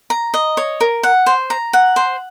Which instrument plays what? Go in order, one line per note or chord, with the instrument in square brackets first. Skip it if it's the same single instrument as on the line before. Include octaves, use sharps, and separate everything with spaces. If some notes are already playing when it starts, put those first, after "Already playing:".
[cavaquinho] A#5
D#5
C#5
A#4
F#5
C5
A#5
F#5
C5